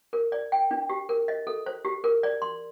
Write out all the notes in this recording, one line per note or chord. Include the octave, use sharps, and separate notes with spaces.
A#4
D5
G5
D4
G4
A#4
D#5
A4
C5
G4
A#4
D5
C6